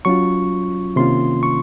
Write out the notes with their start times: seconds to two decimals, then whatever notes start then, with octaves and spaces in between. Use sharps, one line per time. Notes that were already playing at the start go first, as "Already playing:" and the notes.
0.05 F#3 C#4 F4 C#6
0.96 C3 D#3 A#3 C#4 F4 C6
1.43 C#6